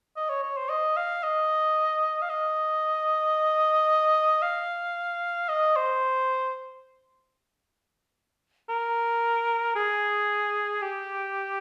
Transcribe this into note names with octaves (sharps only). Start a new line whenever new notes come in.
D#5
C#5
C#5
C5
D#5
F5
D#5
F5
D#5
F5
D#5
C5
A#4
G#4
G4